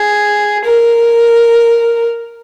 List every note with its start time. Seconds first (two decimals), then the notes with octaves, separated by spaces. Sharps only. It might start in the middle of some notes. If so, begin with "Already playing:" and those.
Already playing: G#4
0.65 A#4